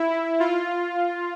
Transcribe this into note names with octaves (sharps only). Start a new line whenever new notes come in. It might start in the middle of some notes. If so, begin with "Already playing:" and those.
Already playing: E4
F4